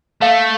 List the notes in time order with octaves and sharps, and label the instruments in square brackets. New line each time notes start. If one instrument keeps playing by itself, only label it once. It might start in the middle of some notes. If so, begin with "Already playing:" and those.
[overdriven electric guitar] A3 [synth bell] F5